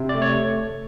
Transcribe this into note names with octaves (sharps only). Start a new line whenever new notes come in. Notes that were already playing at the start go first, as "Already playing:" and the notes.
Already playing: C3
D5
A3
C#5